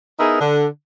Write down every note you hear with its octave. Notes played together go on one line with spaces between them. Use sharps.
B3 D#4 E4 G#4 A#4
D3